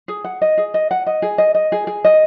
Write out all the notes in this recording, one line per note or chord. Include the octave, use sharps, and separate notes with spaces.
G#4
F#5
D#5
G#4
D#5
F#5
D#5
G#4
D#5
D#5
G#4
G#4
D#5